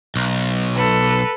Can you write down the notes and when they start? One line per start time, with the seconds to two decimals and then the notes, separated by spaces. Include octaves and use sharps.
0.16 B1
0.74 A4 B4